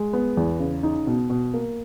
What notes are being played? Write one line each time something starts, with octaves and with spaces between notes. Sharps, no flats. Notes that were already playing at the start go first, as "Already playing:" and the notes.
Already playing: G#3
B3
E2
C#3
D#4
B2
B2
A#3